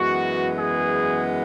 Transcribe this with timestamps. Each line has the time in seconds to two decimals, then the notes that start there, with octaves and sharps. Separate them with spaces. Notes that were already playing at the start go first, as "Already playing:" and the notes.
Already playing: F#2 E3 G#3 B3 F#4
0.57 G#4